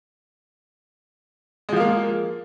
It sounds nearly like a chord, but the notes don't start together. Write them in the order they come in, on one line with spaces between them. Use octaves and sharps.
G#3 F3 F4 A#3